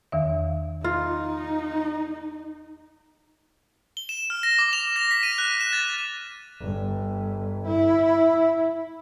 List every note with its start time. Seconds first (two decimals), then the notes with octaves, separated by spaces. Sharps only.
0.12 E2 D#3 E5
0.84 D#4 F4
3.97 G7
4.09 E7
4.30 F6
4.43 A#6
4.59 D6
4.73 F7
4.96 A#6
5.11 B6
5.23 D#7
5.38 F#6
5.61 E7
5.73 A6
6.60 G1
7.66 E4